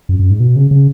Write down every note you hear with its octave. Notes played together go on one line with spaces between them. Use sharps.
F#2
F#2
G#2
B2
C#3
C#3